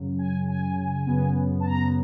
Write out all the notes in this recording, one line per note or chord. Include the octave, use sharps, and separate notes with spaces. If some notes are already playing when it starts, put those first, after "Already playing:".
Already playing: F#2 C#3 F#3
G#5
G#5
F#2 C#3 F#3 B3
A5
A#5